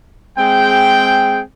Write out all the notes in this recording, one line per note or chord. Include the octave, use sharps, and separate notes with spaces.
G#3 C4 G#4 G5